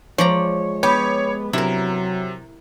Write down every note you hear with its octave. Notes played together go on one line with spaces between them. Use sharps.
F3 G#3 C#5 D5 A#5
B3 G4 C#5
C3 F#3 E4 A#4